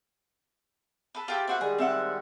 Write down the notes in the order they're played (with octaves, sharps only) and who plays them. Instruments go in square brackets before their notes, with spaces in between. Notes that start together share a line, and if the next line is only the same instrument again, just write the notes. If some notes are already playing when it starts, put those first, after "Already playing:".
[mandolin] A4 B4
F4 G4 A4
[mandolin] A#3 F#4 F#5 [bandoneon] C5 E5 B5
[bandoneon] D#3 G3 G#3 [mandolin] G#4
[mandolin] C4 E5 F#5